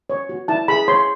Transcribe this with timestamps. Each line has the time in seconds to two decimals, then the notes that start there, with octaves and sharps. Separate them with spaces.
0.10 C#5
0.29 F#4
0.48 E4 A5
0.68 G#4 B5
0.88 C#5 C6